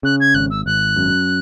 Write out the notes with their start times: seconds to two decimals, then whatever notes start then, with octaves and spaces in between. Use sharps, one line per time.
0.03 C#3 F#6
0.20 G#6
0.34 G#1 F#6
0.50 E6
0.66 G#1 F#6
0.96 F#2